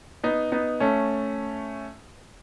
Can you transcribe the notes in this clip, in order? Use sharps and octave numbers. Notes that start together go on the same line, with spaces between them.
B3 D#4
B3 D#4
A3 C#4